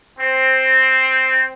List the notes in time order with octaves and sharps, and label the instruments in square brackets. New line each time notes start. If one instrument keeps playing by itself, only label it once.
[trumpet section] C4